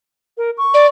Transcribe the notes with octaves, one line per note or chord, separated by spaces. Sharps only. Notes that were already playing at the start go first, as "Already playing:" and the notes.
A#4
C#6
D5